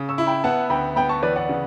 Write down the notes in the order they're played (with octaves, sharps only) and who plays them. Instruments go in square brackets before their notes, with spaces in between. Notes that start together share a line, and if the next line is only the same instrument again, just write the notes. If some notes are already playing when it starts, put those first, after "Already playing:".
Already playing: [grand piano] C#3
[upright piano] C#6 E6
[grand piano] E4
[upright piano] G5 B5
[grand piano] B3 [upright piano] F#5 A5
[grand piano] D2 [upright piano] G5 B5
[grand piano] B3 [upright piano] G5 B5
[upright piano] A5 C#6
[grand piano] E3 [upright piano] B4 D5
[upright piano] D5 F#5
[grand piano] C#3